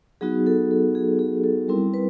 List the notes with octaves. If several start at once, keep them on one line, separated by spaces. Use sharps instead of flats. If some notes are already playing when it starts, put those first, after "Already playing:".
F#3 B3 D#4 F#4 G#4
A4
A4
G#4
G#4
A4
G3 C4 E4 A#4
B4